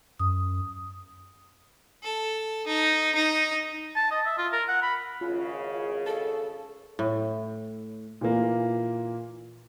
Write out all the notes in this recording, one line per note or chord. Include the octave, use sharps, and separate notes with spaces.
F#2 D#6
A4
D#4
D#4
A5
D#5
E5
F4
A#4
F#5
B5
G#1 C#3 F4
A4 A5
A2
A#2 E3 A#3